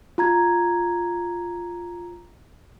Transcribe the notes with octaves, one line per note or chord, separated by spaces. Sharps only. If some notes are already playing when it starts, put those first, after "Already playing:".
F4 A#5 G#6